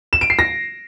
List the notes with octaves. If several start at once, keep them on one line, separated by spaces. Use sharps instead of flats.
E7
D7
C7
A#6